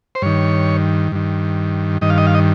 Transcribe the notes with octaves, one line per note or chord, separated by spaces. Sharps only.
C5
G2 D#3 C#5
G2 D#3
G2 D#3 D#5
F5
D#5
F5
D#5